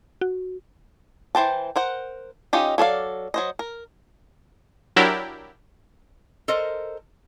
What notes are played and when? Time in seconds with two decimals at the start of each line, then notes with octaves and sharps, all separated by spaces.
0.21 F#4
1.35 E3 C5 G5 A5
1.76 A#4 C5 F#5
2.53 C#4 D#4 F4 G4 D#5
2.78 F#3 A4 D5 F5
3.34 F#3 C5 D#5
3.59 A#4
4.96 F#3 D4 E4 G4 A#4
6.48 A4 A#4 C5 D#5